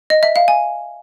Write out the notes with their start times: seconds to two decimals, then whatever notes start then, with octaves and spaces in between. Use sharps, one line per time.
0.10 D#5
0.23 E5
0.36 F5
0.48 G#5